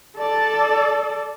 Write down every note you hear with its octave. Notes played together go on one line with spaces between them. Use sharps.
A4 D5